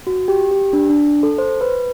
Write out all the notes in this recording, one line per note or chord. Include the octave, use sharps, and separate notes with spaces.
F#4
G4
G4
D4
D4
A4
C5
B4